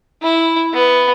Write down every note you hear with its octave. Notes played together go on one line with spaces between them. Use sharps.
E4
B3